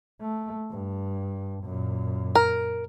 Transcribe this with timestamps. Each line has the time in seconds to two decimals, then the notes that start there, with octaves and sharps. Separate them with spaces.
0.21 A3
0.71 G2
1.63 F#2 A#2
2.35 A#4